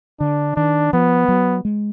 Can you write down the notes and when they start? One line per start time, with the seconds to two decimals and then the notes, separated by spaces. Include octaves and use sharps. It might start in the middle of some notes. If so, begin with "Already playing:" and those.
0.20 D3 D4
0.56 D#3 D4
0.93 F3 B3
1.28 F#3
1.65 G#3